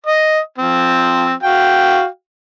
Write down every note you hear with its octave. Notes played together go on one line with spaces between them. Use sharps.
D#5
F3 C4
F#4 F5 G5